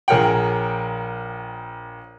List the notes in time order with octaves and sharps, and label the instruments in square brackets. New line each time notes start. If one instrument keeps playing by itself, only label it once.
[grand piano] A#1 G#4 A#4 C#5 F#5 G5